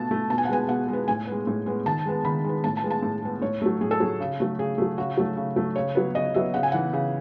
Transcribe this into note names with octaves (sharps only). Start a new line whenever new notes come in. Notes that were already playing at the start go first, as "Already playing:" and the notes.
Already playing: B2 A3 A5
A3
B2 A5
G#5
F#5
G#3 B3 G#5
B2 F#5
G#3 B3
A2 G#5
G#3 B3
A2
G#3 B3
D#3 A5
G#3 B3
D#3 B5
G#3 B3
A2 A5
A5
G#3 B3
A5
A2
G#3 B3
A2 C#5
F#3 A3
A2 G#4
A4
F#3 A3 G#4
C#3
F#3 A3
C#3 G#4
F#3 A3
C#3 F#4
F#3 A3
C#3
F#3 A3
C#3 C#5
F#3 B3
C#3 D#5
F#3 B3 E5
C#3 F#5
G#5
E3 B3 F#5
C#3